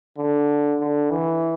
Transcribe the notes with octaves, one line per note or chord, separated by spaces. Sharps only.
D3
D3
E3